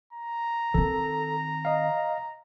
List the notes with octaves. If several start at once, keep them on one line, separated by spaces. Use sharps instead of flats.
A#5
D#3 C4 A4
D#5 F5